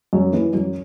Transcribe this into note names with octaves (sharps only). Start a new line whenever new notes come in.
F#2
E3
F#2